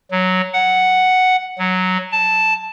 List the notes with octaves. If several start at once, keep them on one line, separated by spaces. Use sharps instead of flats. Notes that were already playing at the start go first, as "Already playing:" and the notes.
F#3
F#5
F#3
A5